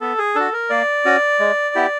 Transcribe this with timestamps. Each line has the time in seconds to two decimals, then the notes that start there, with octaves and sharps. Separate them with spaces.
0.01 B3 A4
0.18 G#4
0.35 D4 F#4 A4
0.53 A#4
0.70 A#3 D5
1.05 C#4 F#4
1.39 G#3
1.75 B3 E4 G4